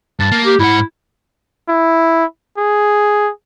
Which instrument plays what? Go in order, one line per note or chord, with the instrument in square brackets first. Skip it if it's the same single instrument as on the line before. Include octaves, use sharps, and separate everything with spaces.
[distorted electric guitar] G2 [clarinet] A5
[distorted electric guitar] A#3
[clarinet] G4
[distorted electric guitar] G#2 F#5 [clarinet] E4
[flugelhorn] E4
G#4